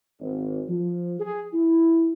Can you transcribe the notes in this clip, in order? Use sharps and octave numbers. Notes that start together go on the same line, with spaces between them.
G#1
F3
G#4
E4